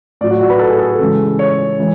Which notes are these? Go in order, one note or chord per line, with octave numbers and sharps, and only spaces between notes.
A2 F#3 D5
F#4
F#4
B4
A4
G#4
A4
C#3 E3 G#3
C#5
E3 G#3